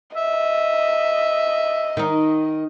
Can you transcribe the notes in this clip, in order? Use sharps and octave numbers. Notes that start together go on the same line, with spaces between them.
D#5 E5
D#3 D#4